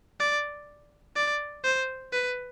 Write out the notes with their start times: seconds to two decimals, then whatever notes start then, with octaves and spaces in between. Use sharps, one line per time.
0.20 D5
1.16 D5
1.64 C5
2.12 B4